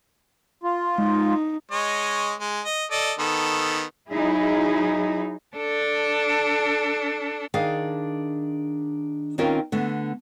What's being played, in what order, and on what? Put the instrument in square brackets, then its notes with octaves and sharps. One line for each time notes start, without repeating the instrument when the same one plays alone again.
[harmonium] F4
[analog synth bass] G#3 [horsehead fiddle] D#4
[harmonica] G#3 C#5 D#5
G#3
D#5
A4 D5 D#5
D#3 B3 A4
[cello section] F#3 D#4 E4 G#4
[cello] D4 A4
[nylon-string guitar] D#3 D4 G#4 F5
D#3 C4 C#4 F4 A#4
D3 A3 B3